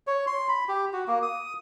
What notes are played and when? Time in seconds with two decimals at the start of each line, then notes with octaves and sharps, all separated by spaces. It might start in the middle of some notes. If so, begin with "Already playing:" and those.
0.07 C#5
0.27 C6
0.49 B5
0.68 G4
0.93 F#4
1.08 A#3
1.22 D#6